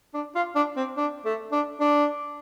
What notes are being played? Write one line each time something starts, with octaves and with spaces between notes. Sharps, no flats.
D4
F4
D4
C4
D4
A3
D4
D4